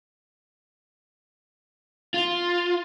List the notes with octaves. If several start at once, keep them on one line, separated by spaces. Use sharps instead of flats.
F4